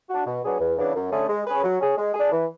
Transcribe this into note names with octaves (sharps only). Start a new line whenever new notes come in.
D4 F#4
B2
F#3 B3 D4 G#4
E2
C#3 E3 B3 D4
F#2
D3 A3 C#4 G#4
G#3
C#4 G#4 B4
F#3
C#4 G#4
G#3
G#4
D4
E3